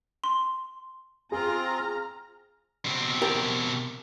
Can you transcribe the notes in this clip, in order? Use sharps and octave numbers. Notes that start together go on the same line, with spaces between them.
C6
C4 F4 G#4 A#5 F6
B2 C4
G4 A#4